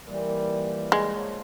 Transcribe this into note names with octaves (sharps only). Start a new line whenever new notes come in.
A#2 E3 G3
G#3
F3 C#5